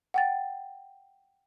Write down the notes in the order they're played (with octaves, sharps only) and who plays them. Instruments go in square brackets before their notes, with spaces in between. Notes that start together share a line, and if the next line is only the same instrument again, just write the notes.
[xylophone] F#5 G5 A6